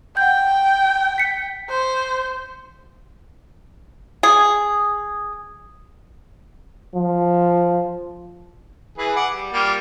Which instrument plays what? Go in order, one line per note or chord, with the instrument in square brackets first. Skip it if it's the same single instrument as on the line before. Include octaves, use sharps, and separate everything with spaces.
[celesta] F#5 G6 [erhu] G5
[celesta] B6 C#7
[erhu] C5
[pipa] G#4
[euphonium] F3
[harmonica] E3 G#4 B4
F#5 D6
G3
G3 A#3 F4